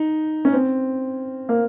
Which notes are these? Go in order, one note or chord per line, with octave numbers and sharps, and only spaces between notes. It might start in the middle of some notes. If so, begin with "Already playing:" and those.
Already playing: D#4
C#4
C4
A#3